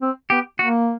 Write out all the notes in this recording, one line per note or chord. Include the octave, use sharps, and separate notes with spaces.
C4
B3 G4
A#3 F#4